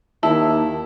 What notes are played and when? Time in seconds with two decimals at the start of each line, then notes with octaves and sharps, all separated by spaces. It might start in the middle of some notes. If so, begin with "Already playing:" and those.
0.23 D#2 E4 A5